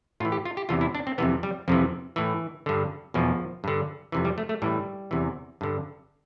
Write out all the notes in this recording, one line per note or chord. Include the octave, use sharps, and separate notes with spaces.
A2 E3 F4
G4
F4
G4
E2 C3 E3 F4
E4
D4
C4
F2 C3 E3 B3
G3
F2 C3 E3 F3
A2 E3
G2 D3
E2 B2 F3
G2 D3
F2 C3 E3
G3
A3
A3
A2 E3 G3
E2 C3 E3
G2 D3